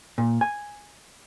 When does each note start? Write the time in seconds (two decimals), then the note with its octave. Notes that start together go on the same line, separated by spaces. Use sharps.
0.18 A#2
0.41 G#5